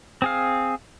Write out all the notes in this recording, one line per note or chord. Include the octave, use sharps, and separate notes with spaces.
C4 G#4 F5